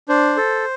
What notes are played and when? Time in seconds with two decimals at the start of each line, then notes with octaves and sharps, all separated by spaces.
0.09 D4 C5
0.37 A4